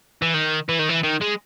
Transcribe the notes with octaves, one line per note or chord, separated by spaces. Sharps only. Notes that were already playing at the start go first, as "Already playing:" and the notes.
E3
D#3
E3
D#3
E3
D#3
G#3